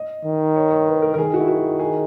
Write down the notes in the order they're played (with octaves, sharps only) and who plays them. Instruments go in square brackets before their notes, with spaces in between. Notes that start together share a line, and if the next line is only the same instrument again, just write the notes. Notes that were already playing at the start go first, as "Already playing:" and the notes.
Already playing: [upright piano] D#5
[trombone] D#3
[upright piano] C#5
C#5
B4
A#4
A#4
[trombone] D#3 [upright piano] G#4
[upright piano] F#4
E4
F#4
G#4